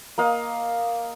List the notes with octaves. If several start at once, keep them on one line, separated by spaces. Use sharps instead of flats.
A#3 D#5 F5